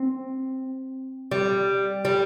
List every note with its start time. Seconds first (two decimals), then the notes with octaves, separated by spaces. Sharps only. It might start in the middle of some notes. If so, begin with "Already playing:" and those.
Already playing: C4
1.31 G3
2.05 G3